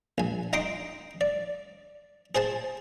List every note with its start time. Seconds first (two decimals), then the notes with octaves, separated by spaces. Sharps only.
0.18 A#1 G#5
0.53 D#4 D#5 G5 C6 D6
1.21 D5
2.35 G#4 C5 G#5 A5